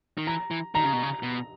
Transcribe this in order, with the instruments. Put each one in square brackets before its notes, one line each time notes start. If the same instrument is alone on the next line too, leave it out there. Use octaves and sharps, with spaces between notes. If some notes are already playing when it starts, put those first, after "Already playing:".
[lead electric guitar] D#3
[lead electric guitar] E3 [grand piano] A#5
[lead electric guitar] E3
[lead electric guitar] D#3 [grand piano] A#5
[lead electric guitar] C#3
B2
C#3
B2